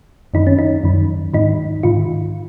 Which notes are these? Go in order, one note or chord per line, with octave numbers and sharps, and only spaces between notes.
F#2 D#3 D#4
C#4
D#4
F#2 D#3
G#2 D#3 D#4
G#2 D#3 F4